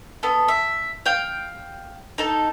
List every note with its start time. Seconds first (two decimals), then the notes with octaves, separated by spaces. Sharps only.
0.23 B3 A4
0.48 E5
1.06 F5 G5
2.18 D#4 A4 A5